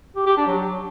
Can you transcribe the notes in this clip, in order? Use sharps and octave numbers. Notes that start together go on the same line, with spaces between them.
G4
G4
D4
F#3